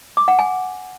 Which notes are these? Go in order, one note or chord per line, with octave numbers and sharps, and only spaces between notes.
D6
F#5
G#5